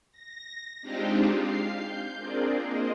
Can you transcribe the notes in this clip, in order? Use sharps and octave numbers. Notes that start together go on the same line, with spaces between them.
A#6
G#3 C4 D4 D#4 F4 G4
F5 C7
G6
C4 D4 F4 G#4 A#4 D5
A#3 C5 D#5